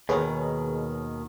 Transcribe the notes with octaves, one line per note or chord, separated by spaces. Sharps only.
D#2 B2 D#3 G#4 B4 C#5